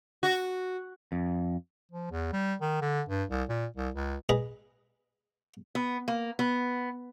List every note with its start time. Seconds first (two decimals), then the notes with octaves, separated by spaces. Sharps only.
0.23 F#4
1.12 F2
1.91 F3
2.11 E2
2.33 G3
2.61 D#3
2.81 D3
3.09 G2
3.30 C2
3.49 A#2
3.77 C2
3.95 C#2
4.29 G#4 B4 D#5 A#5
5.75 B3
6.08 A#3
6.39 B3